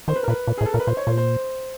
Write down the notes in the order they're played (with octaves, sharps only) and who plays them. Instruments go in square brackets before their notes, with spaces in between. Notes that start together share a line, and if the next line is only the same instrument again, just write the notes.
[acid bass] D#3 [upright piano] C5
[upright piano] B4
A#4
[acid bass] A#2 [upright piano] B4
[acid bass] A#2
[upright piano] G#4
[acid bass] A2
[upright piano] A4
[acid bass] A#2 [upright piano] A#4
[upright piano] B4
[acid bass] A#2 [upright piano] C5
[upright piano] C#5
[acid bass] A#2 [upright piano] C5
[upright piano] C5